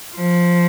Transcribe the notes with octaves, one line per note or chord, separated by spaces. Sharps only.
F3